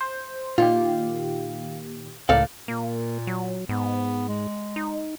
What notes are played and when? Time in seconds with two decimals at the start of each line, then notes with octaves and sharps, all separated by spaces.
0.01 C5
0.58 A#2 D#3 F4 G4
2.29 C#2 A2 A4 A#4 D5 F5
2.68 A#2 A#3
3.27 F#3
3.69 G#2 B3
4.28 G#3
4.76 D#4